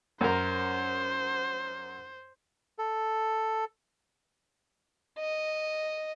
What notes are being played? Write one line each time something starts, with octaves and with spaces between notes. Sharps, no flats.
F#2 A#4 C5
A4
D#5